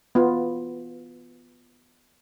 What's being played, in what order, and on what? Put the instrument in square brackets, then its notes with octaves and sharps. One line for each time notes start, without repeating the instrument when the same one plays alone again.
[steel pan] B3 F4